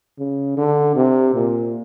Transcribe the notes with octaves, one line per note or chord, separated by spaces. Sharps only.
C#3
D3
C3
A#2